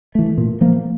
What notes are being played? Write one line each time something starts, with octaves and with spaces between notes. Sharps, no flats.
E3 A3
A#2
F3 A#3